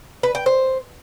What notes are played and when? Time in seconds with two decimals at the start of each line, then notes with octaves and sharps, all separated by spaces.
0.23 B4
0.35 G5
0.46 C5